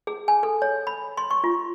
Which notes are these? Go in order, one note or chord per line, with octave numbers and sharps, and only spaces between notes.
G#4
G#5
A4
C#5
B5
C6
C#6
F4